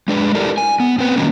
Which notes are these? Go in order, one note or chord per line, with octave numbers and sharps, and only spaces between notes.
G#3 D4 B4
E4 G4 A4 A#4 D5
G#5
B3
C4 B4
D#3 F#3 G3 A#3 C#4